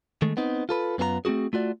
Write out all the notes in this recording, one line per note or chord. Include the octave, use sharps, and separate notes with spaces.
D#3 G#3 A3
B3 C4 D#4
F4 A4 B4
F#2 B3 F4 G#4 A#5
A3 C4 D4 F#4 G#4
A3 F4 F#4 D5